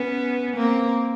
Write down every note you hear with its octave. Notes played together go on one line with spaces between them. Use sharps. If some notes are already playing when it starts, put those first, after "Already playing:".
Already playing: B3 C#4
A#3 C4